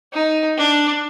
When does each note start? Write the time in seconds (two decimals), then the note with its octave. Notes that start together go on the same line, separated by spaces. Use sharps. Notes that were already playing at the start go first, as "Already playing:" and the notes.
0.13 D#4
0.58 D4